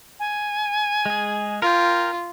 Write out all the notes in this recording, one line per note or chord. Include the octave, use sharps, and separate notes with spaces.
G#5
G#3 G#4
F4 A#4 G5